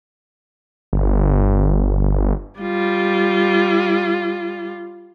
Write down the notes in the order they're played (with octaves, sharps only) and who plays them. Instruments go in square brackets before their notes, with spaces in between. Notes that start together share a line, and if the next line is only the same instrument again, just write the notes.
[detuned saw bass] G1
[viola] G3 F4